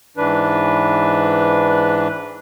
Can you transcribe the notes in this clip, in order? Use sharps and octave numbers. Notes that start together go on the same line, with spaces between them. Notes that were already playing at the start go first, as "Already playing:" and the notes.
G#2 E3 D4 B4